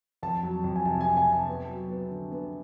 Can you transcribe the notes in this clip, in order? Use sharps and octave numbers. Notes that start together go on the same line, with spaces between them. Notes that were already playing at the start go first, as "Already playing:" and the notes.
F2 A5
F#3
F2
G#5
C3 A5
G#5
C3
G#5
C3
A5
B3
F#3
B3
D3
B3